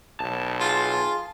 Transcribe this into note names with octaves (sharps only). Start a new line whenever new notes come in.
B1 A5
F4 G#4 C6